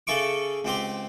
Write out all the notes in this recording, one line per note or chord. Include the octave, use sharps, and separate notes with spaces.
C#3 A4 E5 C#6 D6
C#2 C4 G4 C6